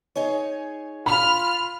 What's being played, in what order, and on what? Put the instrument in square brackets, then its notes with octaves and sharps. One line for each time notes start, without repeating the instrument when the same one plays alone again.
[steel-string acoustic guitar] D#4 G#4 C#5
[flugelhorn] F4 [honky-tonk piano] B5 [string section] F6